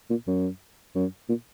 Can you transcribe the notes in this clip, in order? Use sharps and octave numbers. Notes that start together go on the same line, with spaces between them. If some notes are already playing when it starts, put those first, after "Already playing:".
A#2
F#2
F#2
A#2